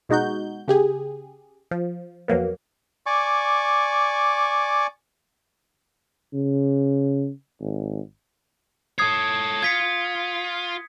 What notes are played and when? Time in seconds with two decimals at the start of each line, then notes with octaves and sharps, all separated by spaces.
0.09 B2 G#3 D#4 F#4 G6
0.68 C#3 G4 G#4
1.71 F3
2.28 F2 F#3 A#3 B3
3.06 D5 G#5 C#6 D6
6.33 C#3
7.61 G#1
8.99 A4 C#5 D#6 G#6 C7
9.63 F4 G#6 B6 C#7